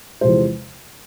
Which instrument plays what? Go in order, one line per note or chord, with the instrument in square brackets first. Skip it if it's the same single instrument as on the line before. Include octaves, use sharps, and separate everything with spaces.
[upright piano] E2 C3 F3 G#3 C5